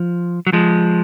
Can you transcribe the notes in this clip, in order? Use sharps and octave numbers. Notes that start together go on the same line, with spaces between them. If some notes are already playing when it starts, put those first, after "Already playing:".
Already playing: F3
F#3
F3 G#3